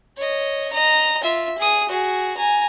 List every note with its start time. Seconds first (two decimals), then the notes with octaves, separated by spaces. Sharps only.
0.17 C#5 D#5
0.73 D#5 A#5
1.24 F4 E5
1.58 G#4 D#6
1.89 F#4 G#4
2.37 G#5 A#5